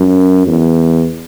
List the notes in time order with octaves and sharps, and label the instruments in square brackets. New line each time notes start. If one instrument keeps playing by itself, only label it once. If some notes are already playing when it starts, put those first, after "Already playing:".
Already playing: [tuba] F#2
E2